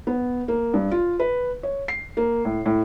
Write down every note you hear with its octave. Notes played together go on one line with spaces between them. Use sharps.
B3
A#3
G2
F4
B4
C#5
C7
A#3
A2
A2